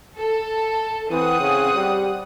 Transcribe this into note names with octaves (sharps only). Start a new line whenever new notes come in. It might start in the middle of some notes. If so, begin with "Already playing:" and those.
A4
E3 C4 F#5 D#6
C#3
G3